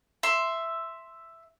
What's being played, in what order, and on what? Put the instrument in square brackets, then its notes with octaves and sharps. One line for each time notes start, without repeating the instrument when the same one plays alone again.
[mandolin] E5 C6